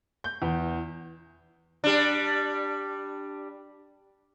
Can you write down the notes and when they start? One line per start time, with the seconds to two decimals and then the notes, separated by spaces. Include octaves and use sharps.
0.24 G6
0.42 E2
1.84 G3 D4